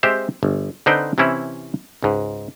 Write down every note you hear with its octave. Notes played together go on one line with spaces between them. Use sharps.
G#3 C4 G4 C5 E5
G1
D3 C4 D#4 B4 C5 G5
C3 E3 C4 C#4 E4
C#2 G#2